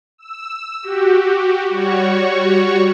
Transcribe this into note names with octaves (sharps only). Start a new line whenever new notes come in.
E6
F#4 G4
G3 F#4 C#5 C#6